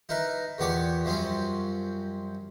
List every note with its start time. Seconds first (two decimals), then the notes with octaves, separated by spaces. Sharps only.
0.09 D#4 E4 A#4 B4
0.58 E2 A#2 B3 G4 C#5 D5
1.05 F#2 F3 G3 C4 C#4